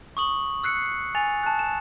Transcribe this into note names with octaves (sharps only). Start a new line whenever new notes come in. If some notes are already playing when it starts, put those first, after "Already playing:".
C#6 D#6 F#7
E6 F#6 C7 C#7
G#5 A6 F7
A5 F#6
E7